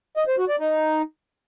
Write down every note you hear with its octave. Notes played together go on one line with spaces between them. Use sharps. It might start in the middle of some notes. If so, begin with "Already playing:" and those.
D#5
C5
F#4
D5
D#4